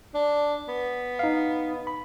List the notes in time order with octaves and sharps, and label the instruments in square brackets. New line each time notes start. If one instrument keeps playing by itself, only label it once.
[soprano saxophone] D4
B3
[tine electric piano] D#4 F5
B5